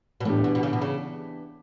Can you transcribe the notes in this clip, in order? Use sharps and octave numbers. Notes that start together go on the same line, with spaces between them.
B2
A2 E3 B3 D4 G4
B2
B2
C#3
B2
C#3